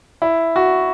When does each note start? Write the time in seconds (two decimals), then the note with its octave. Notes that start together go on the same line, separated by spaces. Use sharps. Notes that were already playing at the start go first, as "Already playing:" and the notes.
0.22 E4
0.56 F#4